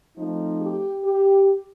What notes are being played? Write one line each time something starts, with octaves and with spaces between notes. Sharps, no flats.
F3 A3 C4 D#4
G4
G4